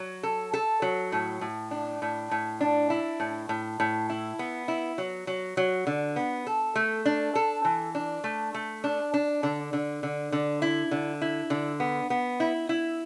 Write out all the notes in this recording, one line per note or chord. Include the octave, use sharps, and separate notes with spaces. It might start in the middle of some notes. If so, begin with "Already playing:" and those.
Already playing: F#3
A4
A4
F#3
A2
A2
D4
A2
A2
D4
E4
A2
A2
A2
E4
B3
E4
F#3
F#3
F#3
D3
B3
A4
A3
D4
A4
E3
D4
A3
A3
D4
D4
D3
D3
D3
D3
E4
D3
E4
D3
B3
B3
E4
E4